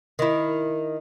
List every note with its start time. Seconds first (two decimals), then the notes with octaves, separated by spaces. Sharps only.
0.19 D#3 E4